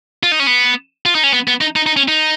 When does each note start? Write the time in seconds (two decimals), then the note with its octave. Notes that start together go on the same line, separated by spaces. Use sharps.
0.23 F4
0.32 D#4
0.40 C#4
0.47 B3
1.06 F4
1.15 D#4
1.24 C#4
1.33 B3
1.48 B3
1.61 D#4
1.76 D#4
1.86 D#4
1.97 C#4
2.08 D#4